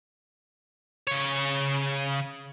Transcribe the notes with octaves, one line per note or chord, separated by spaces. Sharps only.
C#3 C#5